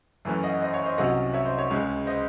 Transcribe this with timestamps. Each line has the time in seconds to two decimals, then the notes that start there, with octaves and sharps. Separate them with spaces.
0.25 F#2 E3 A3 C#4
0.43 D#5 F#5
0.62 C5 D#5
0.74 C#5
0.86 C5 D#5
0.98 C2 C3 F#3 C#4 D#5 F#5
1.34 C#5 E5
1.46 C5 D#5
1.59 C#5
1.70 C#2 C#3 G#3 C#4
2.06 C5 D#5